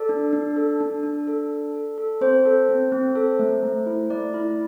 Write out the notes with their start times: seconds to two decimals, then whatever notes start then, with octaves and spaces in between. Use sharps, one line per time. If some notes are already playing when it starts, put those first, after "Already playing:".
Already playing: A4 D5
0.09 D4
0.33 D4
0.56 A4
0.80 D4
1.03 D4
1.27 A4
1.51 A4
1.75 A4
1.98 A4
2.21 C4 C5
2.45 A4
2.69 C4
2.92 C4
3.15 A4
3.39 A3
3.63 A3
3.86 E4
4.10 A3 D5
4.34 E4